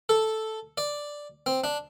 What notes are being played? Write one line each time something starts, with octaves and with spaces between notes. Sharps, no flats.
A4
D5
C4
D4